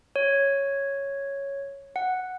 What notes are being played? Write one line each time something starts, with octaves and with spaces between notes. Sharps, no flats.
C#5
F#5